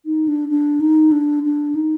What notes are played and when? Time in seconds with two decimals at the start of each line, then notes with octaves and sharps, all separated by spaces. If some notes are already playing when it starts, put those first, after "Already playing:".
0.06 D#4
0.28 D4
0.49 D4
0.80 D#4
1.12 D4
1.43 D4
1.75 D#4